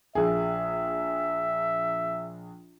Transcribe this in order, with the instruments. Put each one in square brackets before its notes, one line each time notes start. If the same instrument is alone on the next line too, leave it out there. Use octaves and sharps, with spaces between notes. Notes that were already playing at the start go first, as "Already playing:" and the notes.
[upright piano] A#1 G#4 [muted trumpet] E5